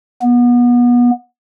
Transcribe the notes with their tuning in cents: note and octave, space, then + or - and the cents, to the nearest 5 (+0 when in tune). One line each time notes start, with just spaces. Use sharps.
B3 -30